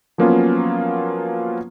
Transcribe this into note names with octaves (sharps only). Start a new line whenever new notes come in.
F3 F#3 A#3 B3 C#4 F4